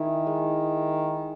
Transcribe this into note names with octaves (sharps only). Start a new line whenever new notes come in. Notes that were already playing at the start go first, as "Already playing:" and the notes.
Already playing: D#3 E4 G#4
G#3